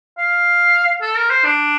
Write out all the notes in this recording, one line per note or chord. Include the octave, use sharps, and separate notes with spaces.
F5
A4
A#4
C5
D4